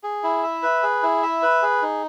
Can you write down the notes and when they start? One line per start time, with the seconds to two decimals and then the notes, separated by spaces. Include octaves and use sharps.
0.03 G#4
0.23 E4
0.43 E5
0.63 B4
0.83 G#4
1.03 E4
1.23 E5
1.43 B4
1.62 G#4
1.82 D#4